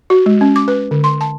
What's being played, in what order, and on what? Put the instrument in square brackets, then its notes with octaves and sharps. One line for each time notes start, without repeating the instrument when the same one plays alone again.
[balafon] F#4
G#3
C#4
D6
B4
D3
C6
A5